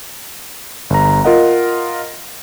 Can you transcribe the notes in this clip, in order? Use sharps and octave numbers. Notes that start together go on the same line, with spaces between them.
G1 A#5
F4 A#4 D#5 F#5